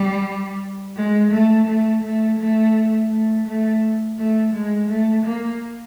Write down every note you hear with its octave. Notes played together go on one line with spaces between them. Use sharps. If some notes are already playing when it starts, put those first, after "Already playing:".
Already playing: G3
G#3
A3
A3
A3
A3
A3
A3
A3
G#3
A3
A#3